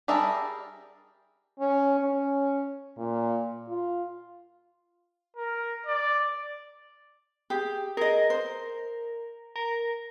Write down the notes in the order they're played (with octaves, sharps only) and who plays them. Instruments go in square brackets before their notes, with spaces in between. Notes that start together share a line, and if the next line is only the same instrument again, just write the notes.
[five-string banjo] G3 G#4 A#4 E5 A5
[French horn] C#4
C#4
A#2
F4
[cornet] A#4
D5
[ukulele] G4 G#4
[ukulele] G#4 D#5 [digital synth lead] A#4
[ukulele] C5
[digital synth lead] A#4